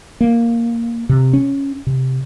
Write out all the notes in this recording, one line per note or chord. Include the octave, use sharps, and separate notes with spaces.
A#3
C3
C#4
C3